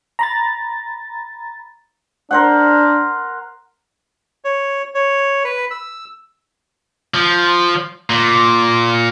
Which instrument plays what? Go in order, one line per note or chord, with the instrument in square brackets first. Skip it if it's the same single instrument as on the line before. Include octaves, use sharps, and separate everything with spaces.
[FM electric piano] A#5 B5 A6
[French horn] D4 [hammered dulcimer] A#4 C5 F#5
[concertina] C#5
C#5
B4
E6
[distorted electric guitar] F3
A#2